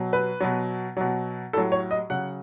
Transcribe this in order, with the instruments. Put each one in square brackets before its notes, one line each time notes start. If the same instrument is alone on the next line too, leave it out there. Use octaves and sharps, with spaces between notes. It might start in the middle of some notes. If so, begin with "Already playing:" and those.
Already playing: [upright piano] B2 F#3
B4
B2 F#3
B2 F#3
A2 F#3 A4
C#5
D#5
C#3 F#3 F#5